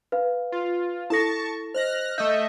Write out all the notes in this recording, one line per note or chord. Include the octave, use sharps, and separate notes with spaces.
B4 F5
F4
E4 A4 A5 C#6 A#6
C5 D#5 F6 F#6 A#6
A3 D#5 E5 G6